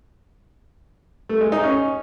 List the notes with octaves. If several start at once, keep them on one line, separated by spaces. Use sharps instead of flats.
A3
G#3
D#4
C#4